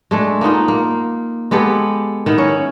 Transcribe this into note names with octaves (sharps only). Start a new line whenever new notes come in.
G#3 A3 D4
A#3 B3 D#4 F4
A#3
G#3 B3 G4 A4
D#3 B3 E4
C#4 C#5